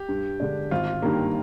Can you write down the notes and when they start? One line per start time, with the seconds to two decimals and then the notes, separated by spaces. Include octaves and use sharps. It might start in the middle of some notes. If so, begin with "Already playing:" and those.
Already playing: G4
0.09 G2
0.40 D3 G#3 D4
0.71 G#1 F4
1.02 G2 D#3 G3 A#3